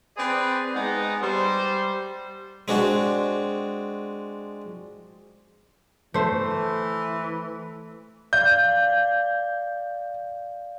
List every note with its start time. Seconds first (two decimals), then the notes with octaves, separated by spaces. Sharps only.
0.18 C4 G#4 B4 D5
0.74 G#3 B3 D#4
1.22 G3 C5
2.68 G#3 C4 D4 F#4
6.14 E3 A3 C5
8.33 D5 F5 G6